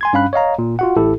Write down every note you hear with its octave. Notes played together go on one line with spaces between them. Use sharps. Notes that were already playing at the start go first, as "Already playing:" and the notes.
G#5 C6 G#6
G2 C#4 F5 B5 F#6
C#5 D#5 F5 A#5
A#2
F4 F#4 F#5
A1 A2 E4 G4 A4